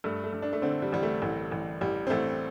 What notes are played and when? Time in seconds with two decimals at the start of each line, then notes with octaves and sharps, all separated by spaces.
0.04 G2 A3
0.24 A3
0.33 G2
0.42 D4
0.53 A3
0.62 D3 C4
0.82 G3
0.92 A1 G3
1.03 A3
1.22 A1
1.52 A1
1.81 A1 G3
2.07 C4
2.10 A1 A3